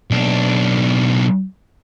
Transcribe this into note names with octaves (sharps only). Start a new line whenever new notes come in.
B1 D4